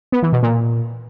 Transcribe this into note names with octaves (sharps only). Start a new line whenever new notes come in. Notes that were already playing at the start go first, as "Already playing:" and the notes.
B3
E3
B2
A#2